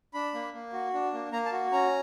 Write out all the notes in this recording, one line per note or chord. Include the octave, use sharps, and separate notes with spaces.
D4 B5
A#3
A#3
F#4
D4
A#3
A#3 A#5
A5
F#4
C#4 A#5